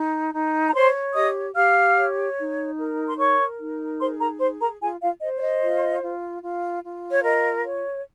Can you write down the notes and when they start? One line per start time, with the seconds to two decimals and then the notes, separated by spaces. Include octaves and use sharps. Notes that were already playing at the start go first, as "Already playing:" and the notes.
Already playing: D#4
0.33 D#4
0.69 A#5
0.74 C5 C#5 C6
1.14 G4 D#5 D#6
1.55 G4 F5 F6
1.96 C#5
2.37 D#4
2.77 A#4
3.07 C6
3.18 A#4 C#5 C#6
3.59 D#4
3.99 G#4 C5 C6
4.19 A#4 A#5
4.39 G#4 C5 C6
4.60 A#4 A#5
4.80 F4 G#4 G#5
5.01 F4 F5
5.21 C5 D#5
5.37 C#5
5.41 D#5
5.62 F4
6.03 F4
6.43 F4
6.83 F4
7.11 C#5
7.24 A#4 D#5
7.64 C#5